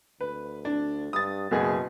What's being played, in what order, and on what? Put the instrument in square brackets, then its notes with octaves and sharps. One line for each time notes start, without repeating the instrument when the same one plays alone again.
[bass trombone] D2 [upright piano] B4
[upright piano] D4
[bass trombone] G2 [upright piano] D#6 A6
[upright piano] F#1 G#4 [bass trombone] B2